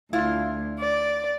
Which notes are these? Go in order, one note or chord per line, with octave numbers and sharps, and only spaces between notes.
D2 E4 F4
D5